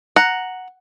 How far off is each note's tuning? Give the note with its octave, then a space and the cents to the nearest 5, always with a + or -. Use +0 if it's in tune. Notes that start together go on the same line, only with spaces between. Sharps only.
F#5 +0 A#5 +0